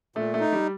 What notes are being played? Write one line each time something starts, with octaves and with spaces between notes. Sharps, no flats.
A#2 A3
A3
D#4
G3